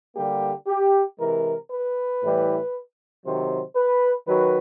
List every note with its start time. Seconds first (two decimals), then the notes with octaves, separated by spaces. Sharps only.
0.15 D3 G3 A#3 G4
0.67 G4
1.18 C3 E3 G#3 A#4
1.70 B4
2.21 A2 E3 G3
3.24 C3 D#3 F#3 C5
3.76 B4
4.27 D#3 F#3 B4